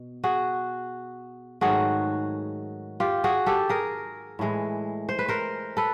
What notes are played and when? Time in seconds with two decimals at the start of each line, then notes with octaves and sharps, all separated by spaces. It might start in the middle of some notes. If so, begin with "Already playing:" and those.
Already playing: B2
0.24 F#4 G#4
1.61 G#2 D#3 F#3 A3 F#4 G#4
3.00 F4 G4
3.24 F#4 G#4
3.46 G4 A4
3.69 G#4 A#4
4.39 A2 E3 G#3
5.09 C5
5.19 B4
5.28 A#4 C5
5.77 A4 B4